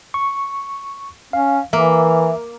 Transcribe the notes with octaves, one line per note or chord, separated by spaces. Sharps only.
C#6
C#4 F5
E3 A#3 E5